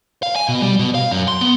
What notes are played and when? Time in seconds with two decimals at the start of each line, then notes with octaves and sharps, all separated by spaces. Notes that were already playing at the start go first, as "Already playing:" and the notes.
0.23 F5
0.36 G#5
0.49 B2
0.62 G3
0.79 B2
0.95 F5
1.11 F#2
1.28 C6
1.41 B3